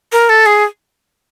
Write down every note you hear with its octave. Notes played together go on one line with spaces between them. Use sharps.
A#4
A4
G#4